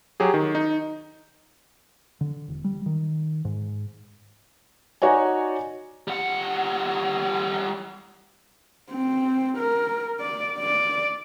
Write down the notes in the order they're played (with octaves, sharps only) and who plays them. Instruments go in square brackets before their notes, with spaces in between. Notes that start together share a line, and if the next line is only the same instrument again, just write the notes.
[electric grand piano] F#3 G4 G#4
D#3
D#4
[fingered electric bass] D3
E1
G3
D#3
G#2
[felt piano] D#4 F#4 C#5 D5 G#5
[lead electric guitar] G3 F#5
[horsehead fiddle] C4
A#4
D5
D5